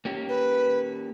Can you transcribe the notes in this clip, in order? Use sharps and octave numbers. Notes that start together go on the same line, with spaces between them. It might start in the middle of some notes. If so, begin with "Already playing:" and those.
A#3 C#4 G4
B4